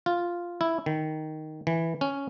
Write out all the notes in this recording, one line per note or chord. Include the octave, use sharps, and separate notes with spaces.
F4
E4
D#3
E3
C#4